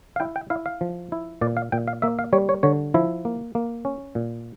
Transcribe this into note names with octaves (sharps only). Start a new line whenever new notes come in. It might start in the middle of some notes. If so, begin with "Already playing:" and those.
F5
E4 G5
G5
E4 F5
F5
F3
E4
A#2 D5
F5
A#2 G5
F5
A#3 E5
F5
G3 C#5
C#5
D3 C#5
F3 E4
A#3
A#3
C#4
A#2